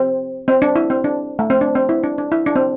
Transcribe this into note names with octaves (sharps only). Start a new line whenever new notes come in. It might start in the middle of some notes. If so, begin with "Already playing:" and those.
Already playing: C4
C4
D4
E4
C4
D4
A3
C4
D4
C4
E4
D4
D4
E4
D4
C4